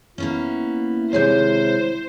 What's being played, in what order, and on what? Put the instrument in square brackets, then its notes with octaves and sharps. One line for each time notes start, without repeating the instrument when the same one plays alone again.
[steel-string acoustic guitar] A#3 B3 C#4 [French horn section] E4
[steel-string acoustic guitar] C3 D#3 G#3 [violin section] C5 [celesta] C#5 G6